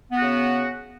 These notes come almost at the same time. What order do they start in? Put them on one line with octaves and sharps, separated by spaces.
B3 F#4 C#3